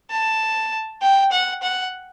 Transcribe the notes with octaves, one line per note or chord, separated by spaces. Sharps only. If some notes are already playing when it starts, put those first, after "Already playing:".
A5
G5
F#5
F#5